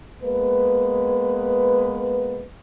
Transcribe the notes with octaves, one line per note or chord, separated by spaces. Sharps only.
G#3 A#3 B3 B4